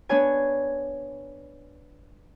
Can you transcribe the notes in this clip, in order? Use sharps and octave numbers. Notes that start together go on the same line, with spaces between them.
B3 D4 C#5 G#5